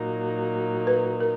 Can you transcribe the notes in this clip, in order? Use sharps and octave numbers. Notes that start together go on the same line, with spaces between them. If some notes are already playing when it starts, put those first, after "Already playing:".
Already playing: A#2 F#3 A#3 D#4
B4
A#4